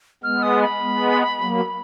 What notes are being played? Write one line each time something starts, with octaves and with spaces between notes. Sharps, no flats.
G#3 B3 F6
D#6
B5
G#3 B3
F#3 A#3